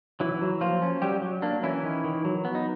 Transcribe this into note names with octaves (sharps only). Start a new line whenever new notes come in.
E3 F#3 E4
F#3
F3 A#3 F4
C#4
F#3 G3 G4
F#3
A#3 D4
E3 C#4 E4
D#3
D#3
F#3
B3
D#4